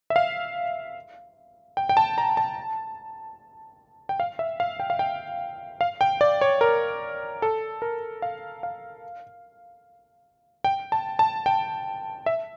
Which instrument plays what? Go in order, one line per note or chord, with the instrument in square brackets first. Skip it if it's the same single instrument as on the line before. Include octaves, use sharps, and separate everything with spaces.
[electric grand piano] E5
F5
G5
G5
A5
A#5
A5
G5
F5
E5
F5
G5
F5
G5
F5
G5
D5
C#5
A#4
A4
A#4
F5
F5
G5
A5
A5
G5
E5